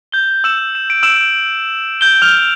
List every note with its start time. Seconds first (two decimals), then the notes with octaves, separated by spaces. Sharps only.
0.12 G6 G7
0.44 E6 E7
0.75 E7
0.90 D7
1.03 E6 E7
2.01 G6 G7
2.22 F6 F7